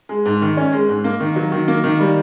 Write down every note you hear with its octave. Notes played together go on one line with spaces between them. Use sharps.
G#3
G#2
D#3
C#4
G#3
G#2
A#3
D#3
F#3
D#3
A#3
D#3
G3